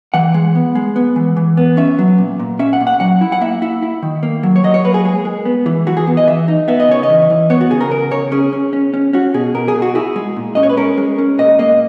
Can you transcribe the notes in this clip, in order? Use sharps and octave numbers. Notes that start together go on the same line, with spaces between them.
E3 F#5
G#3
B3
G#3
B3
E3
E3
B3
C#4 E5
F#3
A#2
A#2
C#4 E5
F#5
A#2
F#5
F#3 F#5
E4
F#5
A#3 E5
E4
E4
D#3
A#3
F#3
C#5
F#3 D#5
C#5
A#3 B4
G#4
G#3 G#4
G#3
B3
E3
E3 F#4
G#4
B3
D#5
E3 E5
D#4
B3 E5
D#5
C#3 C#5
D#5
E3
E3
B3 C#5
F#4
C#3 G#4
A#4
C#3 A#4
C#3 C#5
C#4 G#4
C#4
C#4
C#4
C#4 F#4
B2 G#4
B2 A#4
G#4
B2
F#4
E4 G#4
G#3
A#2
C#4 D#5
C#5
B4
C#4 A#4
G#3
C#4
A#2 D#5
A#3 D#5